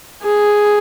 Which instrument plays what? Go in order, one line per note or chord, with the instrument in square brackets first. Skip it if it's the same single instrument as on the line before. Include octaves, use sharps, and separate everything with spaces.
[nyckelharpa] G#4